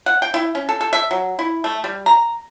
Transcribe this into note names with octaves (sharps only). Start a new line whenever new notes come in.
F#5
G5
E4
C#4
A4
A4
E5
F#3
E4
A3
G3
A#5